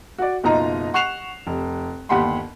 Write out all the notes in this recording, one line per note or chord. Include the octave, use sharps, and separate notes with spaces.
F#4 D5
F#1 B2 D#4 F4 D#5 A#5
F#5 C#6 F#6 C7 E7 F7
F1
G1 D#2 G4 F#5 B5 C6